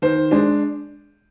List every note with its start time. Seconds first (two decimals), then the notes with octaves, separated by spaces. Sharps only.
0.02 D#3 C5
0.31 G#3 D4